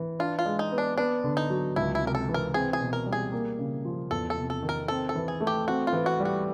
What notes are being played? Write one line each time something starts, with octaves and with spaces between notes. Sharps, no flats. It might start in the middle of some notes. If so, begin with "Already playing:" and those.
Already playing: E3
D4 F4
F4
G#3
D#4
B3
D4
B3 D4
D3
D#4
F#3
C#2 E4
E4
C3
A#4
A4
E3
A#4
C4 G#4
G#4
B2
A#4
G3
G#4
A#3
C#3
F3
E2 A4
A4
C3
A4
D#3
A#4
C4 A4
A4
E3
G#4
A3
G4
C4 F#4
F4
E3
F#4
G3
F#4